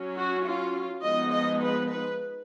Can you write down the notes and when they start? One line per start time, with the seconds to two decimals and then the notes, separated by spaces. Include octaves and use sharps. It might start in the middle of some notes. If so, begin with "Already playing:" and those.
Already playing: F#3 C#4
0.17 F#4
0.46 F4
1.03 F3 G#3 B3 D#4 D#5
1.32 D#5
1.62 B4
1.89 B4